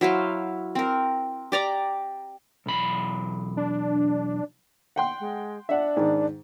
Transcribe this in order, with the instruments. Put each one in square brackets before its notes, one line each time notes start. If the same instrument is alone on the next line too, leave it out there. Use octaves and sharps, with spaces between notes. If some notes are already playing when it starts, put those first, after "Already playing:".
[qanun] F#3 E4 C5 F5
C4 A#4
G4 D5 A#5 D6
[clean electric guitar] B1 E2 B5
[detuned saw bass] D4
[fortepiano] F#5 G5 C6
[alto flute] G#3
[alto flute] D4 [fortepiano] E5 F#5
[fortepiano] G#2 D#3